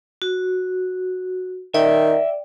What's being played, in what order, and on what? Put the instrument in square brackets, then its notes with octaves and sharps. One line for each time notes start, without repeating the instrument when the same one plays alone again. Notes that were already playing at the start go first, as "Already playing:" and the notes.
[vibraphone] F#4
[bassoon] D#3 [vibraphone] D5 G5 [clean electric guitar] E5